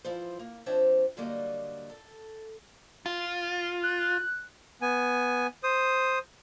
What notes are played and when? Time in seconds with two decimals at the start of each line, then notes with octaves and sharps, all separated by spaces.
0.04 E3 F3 E4 C5
0.39 A#3
0.66 F3 C4 D4 C5 C#5 E5
1.17 D3 F#3 G3 A#3 F#4 D#5
1.90 A4
3.06 F4
3.83 F#6
4.81 B3 G#5
5.63 C5 D#6